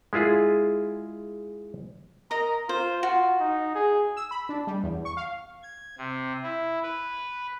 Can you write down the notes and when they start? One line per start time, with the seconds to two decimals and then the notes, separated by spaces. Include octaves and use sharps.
0.13 G#3 E4 F4 G#4
2.31 A#4 D#5 A#5
2.69 F4 C5
3.03 F4 F#4
3.40 D#4
3.75 G#4
4.17 E6
4.31 B5
4.49 D4
4.67 G3
4.83 E2
5.05 C#6
5.17 F5
5.63 G#6
5.98 C3
6.43 E4
6.83 B4